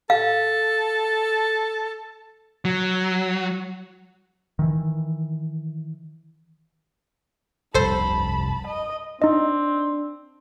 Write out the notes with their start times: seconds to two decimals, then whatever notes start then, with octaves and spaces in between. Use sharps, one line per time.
0.10 A4 F5
2.65 F#3
4.59 D#3 E3
7.74 F1 C2 G2 A4 C5 A5 B5
8.67 D#5
9.22 C4 D4 D#4 D#5